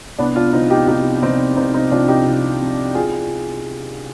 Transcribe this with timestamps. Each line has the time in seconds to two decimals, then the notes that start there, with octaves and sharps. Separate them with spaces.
0.19 C2 B3 D4
0.36 D4 F4
0.53 C3 C4 D#4
0.57 F3
0.70 D#4 G4
0.88 C2 D#4 G4
1.22 C3 F3 C4 D#4
1.56 C2 C4 D#4
1.74 C4 D#4
1.91 C3 F3 D4 F4
2.08 D#4 G4
2.26 C2
2.60 C3 F3
2.94 F4 G#4